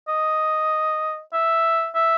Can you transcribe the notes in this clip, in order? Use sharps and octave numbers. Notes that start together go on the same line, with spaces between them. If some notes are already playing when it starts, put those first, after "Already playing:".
D#5
E5
E5